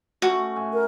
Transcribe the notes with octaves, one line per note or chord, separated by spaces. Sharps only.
A3 C#4 F#4
A2 E5 G#5
A#4